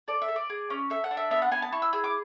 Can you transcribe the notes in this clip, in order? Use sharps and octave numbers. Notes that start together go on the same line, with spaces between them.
A4 D5
E5
A4
D5
G#4
C#4
A4 E5
F#5
D4
E5
B3 E5
F#5
B3 G#5
A5
E4 C#6
E6
G#4 E6
D6